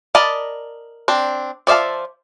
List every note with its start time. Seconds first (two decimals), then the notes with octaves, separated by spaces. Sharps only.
0.15 A#4 D5 D#5 A5 B5
1.08 C4 D4
1.67 F3 D5 E5 F5 A5